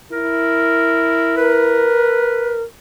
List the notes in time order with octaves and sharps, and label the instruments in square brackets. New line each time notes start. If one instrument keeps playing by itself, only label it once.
[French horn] E4 [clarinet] A#4
[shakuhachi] A#4 [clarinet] B4